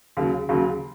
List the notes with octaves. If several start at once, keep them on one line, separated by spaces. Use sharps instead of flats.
D#2 C#3 F#3
D#2 C#3 F#3